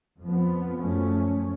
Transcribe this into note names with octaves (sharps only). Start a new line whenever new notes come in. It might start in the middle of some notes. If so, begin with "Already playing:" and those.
F2 F3 B3
F#2 F3 A3 C#4